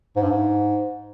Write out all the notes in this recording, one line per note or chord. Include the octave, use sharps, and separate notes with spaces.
G#2
G2
G#2